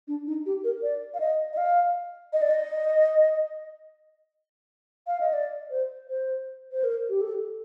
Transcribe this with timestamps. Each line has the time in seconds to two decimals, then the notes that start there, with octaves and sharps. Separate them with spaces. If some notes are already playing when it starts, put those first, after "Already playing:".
0.08 D4
0.27 D#4
0.46 G4
0.64 A#4
0.83 D5
1.14 F5
1.20 D#5
1.53 D#5
1.57 F5
2.33 D#5
2.42 D5
2.50 D#5
5.07 F5
5.20 D#5
5.33 D5
5.70 C5
6.08 C5
6.72 C5
6.84 A#4
7.09 G4
7.21 A4